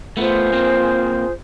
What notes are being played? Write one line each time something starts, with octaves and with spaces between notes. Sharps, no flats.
A3 B3 F4 G#4 C5
A#3 C4